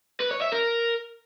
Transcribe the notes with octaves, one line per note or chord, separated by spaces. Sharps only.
B4
C#5
E5
A#4